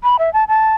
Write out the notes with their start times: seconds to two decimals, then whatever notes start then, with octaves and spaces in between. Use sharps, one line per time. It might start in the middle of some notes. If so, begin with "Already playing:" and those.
0.03 B5
0.19 E5
0.33 A5
0.48 A5